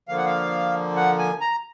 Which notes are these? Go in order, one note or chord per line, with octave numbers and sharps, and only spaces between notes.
D3 F3 A#3 F5
F#5
F5
F#5
G#5
A#5